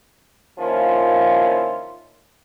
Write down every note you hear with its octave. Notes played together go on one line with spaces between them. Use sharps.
D#3 F3 A#3 C#4 E4 F4